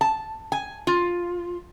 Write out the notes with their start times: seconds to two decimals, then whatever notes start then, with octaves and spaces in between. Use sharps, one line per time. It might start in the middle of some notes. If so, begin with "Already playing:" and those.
0.01 A5
0.52 G#5
0.87 F4